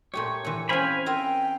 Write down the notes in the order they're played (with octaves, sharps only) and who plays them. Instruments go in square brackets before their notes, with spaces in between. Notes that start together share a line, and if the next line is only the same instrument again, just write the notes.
[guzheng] A#2 A3 G4 [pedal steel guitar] C#5
[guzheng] A#2 E3
[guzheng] C4 C#4 [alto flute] C5 [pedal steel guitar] F5 G#5 B5
[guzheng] F4 A#4 E5 [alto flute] G5